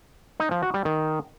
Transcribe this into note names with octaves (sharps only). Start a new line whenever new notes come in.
D#4
F3
F#4
G3
D#3